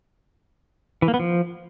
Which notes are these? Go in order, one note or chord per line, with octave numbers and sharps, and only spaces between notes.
E3
A#3
B3
F3